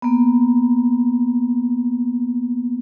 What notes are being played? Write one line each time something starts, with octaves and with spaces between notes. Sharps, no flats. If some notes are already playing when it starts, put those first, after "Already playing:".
A#3 B3